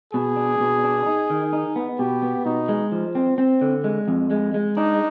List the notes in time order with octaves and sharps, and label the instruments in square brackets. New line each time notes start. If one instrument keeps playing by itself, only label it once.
[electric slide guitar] B2 [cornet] G#4
[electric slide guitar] D4
B2
D4
D#4
D#3
D#4
B3
[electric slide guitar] B2 [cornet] G4
[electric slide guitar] B3
[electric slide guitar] B2 [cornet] D#4
[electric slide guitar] G#3
F3
C4
C4
D3
G#3
F2
G#3
G#3
[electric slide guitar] D4 [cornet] D#4